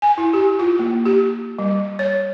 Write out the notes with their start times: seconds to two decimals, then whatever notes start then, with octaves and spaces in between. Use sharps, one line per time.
0.02 G#5
0.18 E4
0.33 G4
0.59 F4
0.79 A#3
1.06 G4
1.59 G3
1.99 C#5